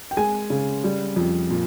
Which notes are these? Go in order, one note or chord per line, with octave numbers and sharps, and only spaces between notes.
G5
G#3 G#5
C#3
G3
F2
A#2